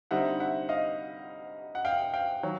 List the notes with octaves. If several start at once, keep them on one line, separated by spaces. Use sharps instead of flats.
D3 G3 C4 D#4 E5 F#5
E5 F#5
D#5 F5
F#5
F5 G5
F5 G5
D#3 F#3